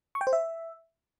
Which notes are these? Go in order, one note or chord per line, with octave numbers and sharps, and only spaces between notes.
C#6
G5
C5
E5